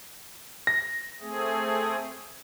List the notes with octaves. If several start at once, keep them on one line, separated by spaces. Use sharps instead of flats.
A#6
A3 C4 G#4